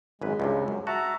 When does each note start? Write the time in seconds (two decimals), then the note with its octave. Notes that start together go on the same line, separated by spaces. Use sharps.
0.22 G#1 F#2 G#3 B4
0.40 C#2 G2 C3
0.68 F#2
0.87 F#4 E5 A5 A#5